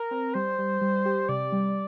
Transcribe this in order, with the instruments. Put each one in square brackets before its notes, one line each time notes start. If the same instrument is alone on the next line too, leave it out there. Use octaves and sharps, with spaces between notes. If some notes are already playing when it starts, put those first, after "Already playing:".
Already playing: [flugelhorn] A#4
[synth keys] C4
[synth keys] G3 [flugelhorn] C5
[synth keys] G3
G3
G4
[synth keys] C3 [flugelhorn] D5
[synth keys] G3